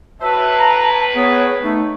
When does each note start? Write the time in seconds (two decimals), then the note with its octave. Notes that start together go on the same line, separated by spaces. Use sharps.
0.21 A2 F#4 B4 C#5 E5 A5
0.59 A#5
1.16 B3 G#4 C#5
1.63 A3 D#4